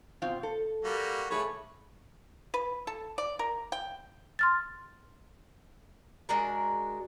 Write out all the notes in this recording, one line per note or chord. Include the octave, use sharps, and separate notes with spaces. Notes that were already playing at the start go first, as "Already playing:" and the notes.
B2 C4 F4
A4
G3 A#3 F#4
A3 G#4 A4 B4 C#5
B4
A4
D5
A#4
G5
C6 F6 A6
G#3 D4 F#4 A#4